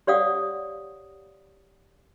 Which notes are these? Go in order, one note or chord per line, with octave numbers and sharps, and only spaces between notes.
G4 C#5 D5 F5 F#5 D#6